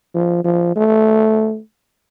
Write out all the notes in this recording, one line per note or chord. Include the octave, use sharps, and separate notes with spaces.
F3
F3
A3